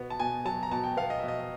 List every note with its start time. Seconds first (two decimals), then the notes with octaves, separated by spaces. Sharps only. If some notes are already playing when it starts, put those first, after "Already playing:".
Already playing: B2 B3
0.10 A5
0.20 B2 G#5
0.45 F#3 A5
0.63 A#5
0.71 B2 A5
0.84 G5
0.97 B3 F5
1.10 D#5
1.20 B2 E5
1.28 D#5